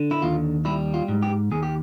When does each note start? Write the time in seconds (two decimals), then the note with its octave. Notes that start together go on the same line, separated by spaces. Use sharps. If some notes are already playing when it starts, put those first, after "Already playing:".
Already playing: D3
0.11 E4
0.22 D#2 F4
0.65 G3 E4
0.94 F4
1.08 G#2
1.23 G4
1.51 D#2 G#4
1.63 G4